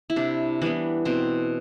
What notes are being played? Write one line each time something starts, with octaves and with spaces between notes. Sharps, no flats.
E4
C3 D4
E3 G3 B3 D4
B2 C4